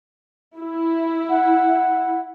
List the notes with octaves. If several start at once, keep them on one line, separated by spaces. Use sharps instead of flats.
E4
F#5